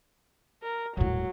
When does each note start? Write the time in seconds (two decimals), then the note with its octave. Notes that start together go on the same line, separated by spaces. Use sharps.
0.63 A#4
0.97 D#1 A2 F#3